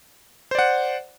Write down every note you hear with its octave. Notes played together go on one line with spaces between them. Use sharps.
C5 D5 F#5